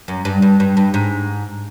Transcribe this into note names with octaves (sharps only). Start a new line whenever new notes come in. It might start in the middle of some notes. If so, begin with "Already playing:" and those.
F#2
G2
G2
G2
G2
G#2